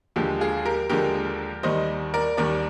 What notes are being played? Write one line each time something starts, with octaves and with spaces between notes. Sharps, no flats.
D#2 D3 F3 G#3 G4
F4 G#4
G4 A#4
D#2 D3 F3 G#3 G4 A#4
D#2 D#3 G3 C5 D#5
A#4 D5
D#2 D#3 G3 A#4 D5